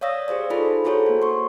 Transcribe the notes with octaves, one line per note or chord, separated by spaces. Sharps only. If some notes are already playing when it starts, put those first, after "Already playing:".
C#5 D5 F5 D#6 E6 A#6
G4 G#4 C5 D5
D#4 F4 G#4 A4 C5 B5
E4 F#4 G#4 A4 C5 C#5
A#3 F#4
C6 C#6